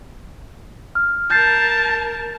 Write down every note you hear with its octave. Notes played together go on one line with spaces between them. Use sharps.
F6
A#4 A5 G6 A6 C7